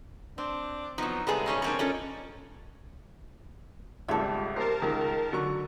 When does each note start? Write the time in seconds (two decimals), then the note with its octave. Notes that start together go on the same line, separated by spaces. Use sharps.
0.38 C4 D4
0.98 F3 F#3 B3 D#4
1.27 C3 G3 G#3 B3 G#4 A4
1.46 C#3 C#4 D#4
1.62 F3 A#3 C4 D4 C#5
1.79 C#4 F4 A4 D#5
4.08 G#1 C#2 G3 A3 F4 A4 E5
4.56 G4 A#4 C5 A5 A#5 C7
4.82 C#2 D#3
5.32 D3 F#3 C#6